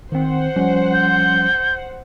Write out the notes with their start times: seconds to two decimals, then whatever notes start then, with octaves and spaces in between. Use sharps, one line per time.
0.12 D#3 C4 C5 F#5
0.56 F3 G3 C#4
0.93 G6